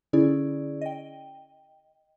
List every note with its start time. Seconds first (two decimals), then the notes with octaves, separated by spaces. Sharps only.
0.13 D3 C#4 E4 G#4 D5
0.81 D#5 G5